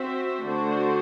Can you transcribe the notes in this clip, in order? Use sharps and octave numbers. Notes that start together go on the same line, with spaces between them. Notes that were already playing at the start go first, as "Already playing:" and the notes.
Already playing: C4 F#4 C5 E5
D3 A3 D4 F#4 C5